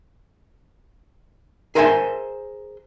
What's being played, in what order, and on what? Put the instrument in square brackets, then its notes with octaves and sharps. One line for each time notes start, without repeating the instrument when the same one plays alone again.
[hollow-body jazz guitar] G#4 A#4 C5 E5 F#5 G#5